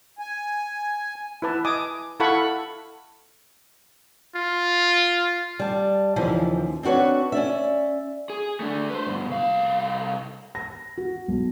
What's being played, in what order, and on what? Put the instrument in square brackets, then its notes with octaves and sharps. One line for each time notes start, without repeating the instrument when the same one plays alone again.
[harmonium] G#5
[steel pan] E4 B4 A5
D#5 G#5 D6 D#6
E4 A4 F5 F#5 B5 C#6
[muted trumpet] F4
[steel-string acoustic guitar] G3 A5
D#2 C#3 E3 F3
C4 D4 F#4 B4 C#5
C#4 D5 E5
[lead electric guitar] G#4
A3 D4
B4 C5
G2 B2
C2 F5
[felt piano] A#6
F#4
B1